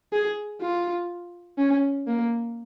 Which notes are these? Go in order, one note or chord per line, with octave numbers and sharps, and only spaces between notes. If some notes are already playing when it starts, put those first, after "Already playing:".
G#4
F4
C#4
A#3